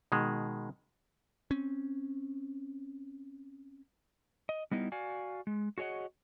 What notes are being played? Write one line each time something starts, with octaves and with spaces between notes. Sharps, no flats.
B2 D#3 G#3
C4 C#4
D#5
G3 B3 D#4 E4
F#4 D5 F5 G#5
G#3
F#4 G#4 C#5 D#5 F#5